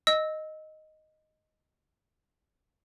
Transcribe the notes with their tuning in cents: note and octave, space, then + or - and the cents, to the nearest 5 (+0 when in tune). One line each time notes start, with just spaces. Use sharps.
D#5 +0 E6 -20